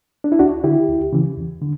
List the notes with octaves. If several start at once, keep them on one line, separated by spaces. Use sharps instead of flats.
D4
E4
D2 D4 F#4
D3 E4 G4
D2
C#3 E3
E2
D3